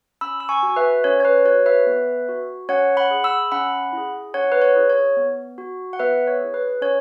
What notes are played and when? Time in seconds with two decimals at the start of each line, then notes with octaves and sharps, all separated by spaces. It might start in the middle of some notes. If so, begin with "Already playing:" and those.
0.21 C#4 B5 E6
0.40 E6
0.49 G#5 C#6
0.63 F#4
0.76 B4 E5
1.04 C#4 C#5
1.20 C#5
1.25 B4
1.45 F#4 C#5
1.66 B4 E5
1.87 B3
2.29 F#4
2.69 C#4 C#5 F#5
2.97 F#5 B5
3.11 G#4
3.24 B5 E6
3.52 C#4 F#5 B5
3.93 E4 G#4
4.34 C#4 C#5 F#5
4.52 B4
4.62 C#5
4.76 E4 G#4
4.90 C#5
5.17 B3
5.58 F#4
5.93 F#5
5.99 B3 B4 E5
6.27 C#5
6.41 E4 G#4
6.54 B4
6.82 C#4 C#5